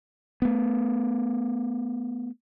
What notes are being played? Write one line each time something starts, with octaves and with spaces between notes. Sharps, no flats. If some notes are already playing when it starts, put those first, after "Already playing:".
A3 B3